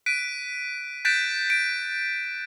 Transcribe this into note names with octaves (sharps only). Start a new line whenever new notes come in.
F#6 B6 D7 D#7
F#6 G6 A6 B6 D7 E7
D7